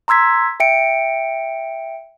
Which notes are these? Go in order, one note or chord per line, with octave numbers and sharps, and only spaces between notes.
A#5 C6 E6 G#6 B6
E5 G5 C#7 D7